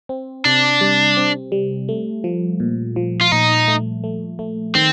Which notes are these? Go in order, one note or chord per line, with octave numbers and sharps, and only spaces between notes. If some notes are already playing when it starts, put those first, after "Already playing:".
C4
C3 D4
G3
C4
G3
A3
F3
A#2
F3
F4
A#2 D#4
A3
A3
A3
D#3 C4